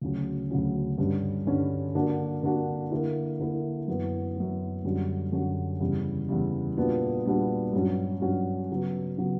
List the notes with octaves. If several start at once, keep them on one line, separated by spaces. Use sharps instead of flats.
D2 C#3 F#3 C#4
D2 C#3 F#3 C#4
G2 D3 G3 C#4
G2 D3 G3 C#4
D3 A#3 D4 F#4
D3 A#3 D4 F#4
D3 A#3 E4
D3 A#3 E4
F#2 E3 B3
F#2 E3 B3
F#2 D3 G3 C#4 F#4
F#2 D3 G3 C#4 F#4
E2 C#3 G3
E2 C#3 G3
A#2 G3 B3 D4 F#4
A#2 G3 B3 D4 F#4
G2 F#3 C#4 F#4
G2 F#3 C#4 F#4
C#3 F#3 B3
C#3 F#3 B3